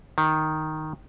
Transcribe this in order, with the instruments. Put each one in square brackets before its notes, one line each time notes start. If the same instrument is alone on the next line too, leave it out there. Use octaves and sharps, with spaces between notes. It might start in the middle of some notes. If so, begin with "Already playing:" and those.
[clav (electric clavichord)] D#3